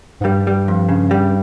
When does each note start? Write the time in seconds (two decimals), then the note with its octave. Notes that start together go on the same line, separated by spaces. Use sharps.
0.21 G#2
0.25 G2 G3
0.47 G3
0.68 F2
0.89 C#3
1.11 G3